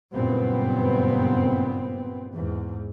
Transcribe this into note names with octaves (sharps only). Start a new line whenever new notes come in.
F#1 G2 A#2 B3 C4
E2 G#2